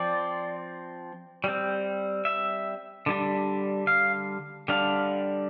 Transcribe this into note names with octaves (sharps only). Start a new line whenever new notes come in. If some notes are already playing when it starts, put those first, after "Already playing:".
Already playing: F3 C4 D5
G3 C4
E5
D3 G3 D4
F5
D3 G3 D4 F5